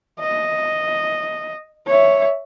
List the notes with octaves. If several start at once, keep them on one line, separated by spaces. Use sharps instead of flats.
D#5
C#5 E5